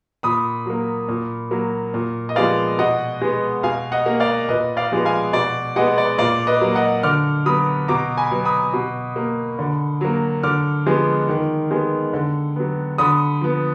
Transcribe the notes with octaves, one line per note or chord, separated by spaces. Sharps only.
A#2 B5 D#6
F#3 A#3
A#2
F#3 A#3
A#2
D#5
F3 G#3 B3 D5 F5
B2 D#5 F#5
G#3 B3
B2 F5 G#5
D#5 F#5
A#3
D5 F5
A#2 B4 D#5
D5 F5
F3 G#3 B3
F5 G#5
B2 D5
G#3 B3 D#5 F#5
D5
A#2 D5 F5
B4 D#5
F#3 A#3
D#5 F#5
D3 D6 F6
F#3 B3 B5 D#6
B2 A#5 D6
G#5 B5
F#3 B3
B5 D#6
B2
A#3
D3
F#3 A#3
D3 D6 F6
F3 G#3 B3
D#3
G#3 B3
D3
F#3 B3
D3 B5 D#6
F3 B3